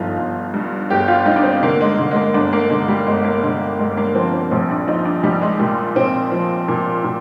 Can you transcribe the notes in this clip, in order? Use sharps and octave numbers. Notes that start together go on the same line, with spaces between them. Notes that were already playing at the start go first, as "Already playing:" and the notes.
Already playing: G1 G2 F3 D#4 F4
G1
G2
G1 G4
F4
G2 D#4
D4
C4
D3 A#3
G#3
D3 G#3
G#3
A#3
G1 D4
A#3
D3 G#3
G3
G1 G#3
A#3
D3 G#3
G2 G#3
A#3
F3 C4
C4
A#1 C4
D4
F3 D#4
D4
A#1 G3
G#3
A#2 G3
A#2 C4
F3
A#2
A#2